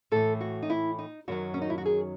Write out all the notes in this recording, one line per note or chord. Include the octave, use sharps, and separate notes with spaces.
A2 E3 A4
F#4
D#4
E4
D#4
F#2 D#3 F#3 F#4
C#4
D#4
E4
F#4
G#4